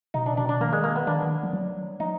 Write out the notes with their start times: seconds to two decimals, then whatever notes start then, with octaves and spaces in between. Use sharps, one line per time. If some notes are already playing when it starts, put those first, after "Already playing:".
0.14 B2 D#4
0.26 D4
0.37 B2 D4
0.49 D4
0.60 D#3 A#3
0.73 G#3
0.84 A#3
0.96 B3
1.07 D#3 D4
1.22 D#3
1.43 F3
1.53 F#3
2.00 F3 D#4